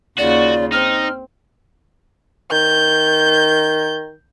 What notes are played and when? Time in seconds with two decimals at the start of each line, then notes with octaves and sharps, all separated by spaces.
0.18 D#2 C#3 F4 F#4 D5
0.72 C4 D#4 F6
2.52 D#3 G6